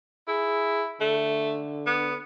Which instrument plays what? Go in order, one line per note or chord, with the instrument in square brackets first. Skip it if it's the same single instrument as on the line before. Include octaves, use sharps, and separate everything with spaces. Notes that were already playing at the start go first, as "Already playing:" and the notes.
[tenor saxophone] E4 [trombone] G#4
[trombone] D3 [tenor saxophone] A3
[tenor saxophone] B3